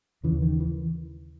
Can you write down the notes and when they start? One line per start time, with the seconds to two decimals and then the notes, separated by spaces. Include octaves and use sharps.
0.23 D#2 C#3 E3
0.42 D#3
0.60 E3